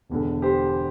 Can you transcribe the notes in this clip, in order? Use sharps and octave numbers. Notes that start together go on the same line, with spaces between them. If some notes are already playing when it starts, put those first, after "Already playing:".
E1 E2 D3
G4 C5